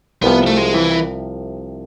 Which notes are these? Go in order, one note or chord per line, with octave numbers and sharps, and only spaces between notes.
C2 C3 F3 B3
A3
G#3
E3